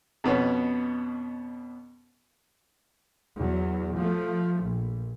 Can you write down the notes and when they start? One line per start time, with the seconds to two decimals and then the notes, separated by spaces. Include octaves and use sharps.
0.24 F2 B2 B3 C#4
3.37 E2 F#3
3.98 F3 A3
4.63 A#1